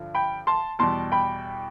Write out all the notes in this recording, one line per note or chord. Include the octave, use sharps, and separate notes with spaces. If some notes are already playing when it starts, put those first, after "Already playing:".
Already playing: G2 D3 F3
G5 B5
A5 C6
E2 B2 G3 A5 C6
G5 B5